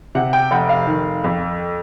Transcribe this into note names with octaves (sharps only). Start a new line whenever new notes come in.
C3 F#5
G5
F1 F#5
F5
D#3
F2